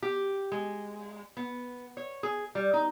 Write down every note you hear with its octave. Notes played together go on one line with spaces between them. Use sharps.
G4
G#3
B3
C#5
G#4
G3
D#4